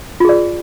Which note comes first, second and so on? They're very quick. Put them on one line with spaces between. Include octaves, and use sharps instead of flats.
F4 G#4 D5